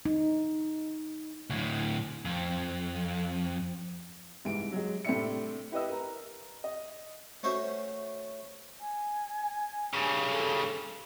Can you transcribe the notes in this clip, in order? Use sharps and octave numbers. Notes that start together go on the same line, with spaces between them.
D#4
D2 A2
F2
C2 G#2 E3 D7
F#3 G#3
A2 C3 C4 D4 E5 C#7
E4 G4 B4 D#5 E6
A#4 B4 A#5
D#5
A3 C#4 F#4 C5 E5
G#5
G2 C#3
A4